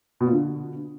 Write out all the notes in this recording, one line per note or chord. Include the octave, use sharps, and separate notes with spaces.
B2
A#2
D3